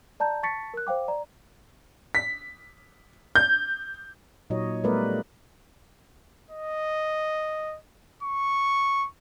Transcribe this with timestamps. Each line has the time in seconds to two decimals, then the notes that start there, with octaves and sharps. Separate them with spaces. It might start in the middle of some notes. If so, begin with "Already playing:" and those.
0.20 D5 A5 A#5 G6
0.43 A5 C#6 A6 B6 C#7
0.74 A#4 F#6
0.87 C5 F5 G5 D6
1.08 D5 A#5
2.15 B6
3.35 G6
4.50 A#2 F#3 D#4 C#5 D#5
4.84 G3 A3 B3 A#4 B4 D5
6.51 D#5
8.23 C#6